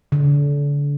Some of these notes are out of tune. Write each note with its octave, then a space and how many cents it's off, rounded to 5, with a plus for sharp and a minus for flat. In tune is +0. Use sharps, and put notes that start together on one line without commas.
D3 -35